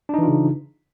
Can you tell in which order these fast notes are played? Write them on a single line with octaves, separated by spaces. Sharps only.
D4 D#4 E3 F4 C#3